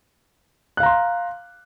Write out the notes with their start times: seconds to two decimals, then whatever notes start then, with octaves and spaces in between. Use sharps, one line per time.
0.77 F#6
0.80 F5
0.83 A#5
0.86 C6